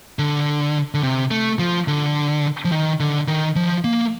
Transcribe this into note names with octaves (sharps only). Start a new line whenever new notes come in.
D3
D3
C3
A3
F3
D3
F3
D#3
D3
D#3
F3
A#3